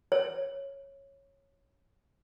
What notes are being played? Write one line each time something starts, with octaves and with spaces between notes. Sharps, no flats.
C#5